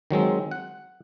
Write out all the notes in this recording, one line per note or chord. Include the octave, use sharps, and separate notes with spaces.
D#3 F#3 G#3 C4
F#5